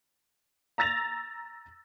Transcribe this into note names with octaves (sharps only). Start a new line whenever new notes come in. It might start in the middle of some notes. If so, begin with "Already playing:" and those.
A#5 E6 A6 A#6 F7